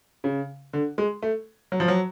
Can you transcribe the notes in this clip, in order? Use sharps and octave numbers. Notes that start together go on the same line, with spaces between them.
C#3
D3
G#3
A3
F#3
F3
F#3